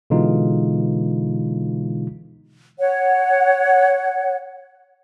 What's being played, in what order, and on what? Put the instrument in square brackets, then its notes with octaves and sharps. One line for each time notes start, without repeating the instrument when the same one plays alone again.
[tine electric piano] B2 D3 E3 G#3 D#4 F4
[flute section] C#5 F#5